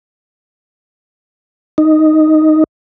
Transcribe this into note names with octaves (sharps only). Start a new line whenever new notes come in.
D#4